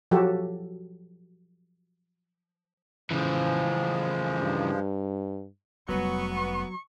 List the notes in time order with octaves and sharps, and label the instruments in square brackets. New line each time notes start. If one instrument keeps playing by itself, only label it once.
[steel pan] F3 F#3 F#4 G4 A4
[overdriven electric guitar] C#3 E3 [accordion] F3 G#3
[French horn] G2
[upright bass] F1 G3 [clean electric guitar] F#3 [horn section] B3 [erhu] C#6